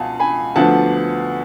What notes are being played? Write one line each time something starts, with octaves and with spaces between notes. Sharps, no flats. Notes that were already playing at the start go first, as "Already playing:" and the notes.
Already playing: C#2 B2 F5 F#5 G#5 A5
G#5 B5
D2 D3 F3 B3 F#5 A5